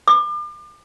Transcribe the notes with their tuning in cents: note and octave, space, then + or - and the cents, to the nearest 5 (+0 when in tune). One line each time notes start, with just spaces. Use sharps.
D6 +35